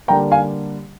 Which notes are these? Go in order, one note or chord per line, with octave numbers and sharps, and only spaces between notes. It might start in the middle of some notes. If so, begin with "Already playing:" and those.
D3 G3 A#3 D4 G5 A#5
F5 G#5